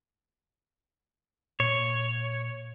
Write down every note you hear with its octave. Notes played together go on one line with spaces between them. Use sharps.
A#2 C#5